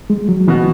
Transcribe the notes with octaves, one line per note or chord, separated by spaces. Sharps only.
G#3
F#3
B2 E3 B3 F#4